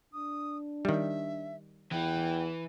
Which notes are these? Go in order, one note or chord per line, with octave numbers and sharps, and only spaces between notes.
D4 D#6
D#3 G3 E5
E2 E3 G5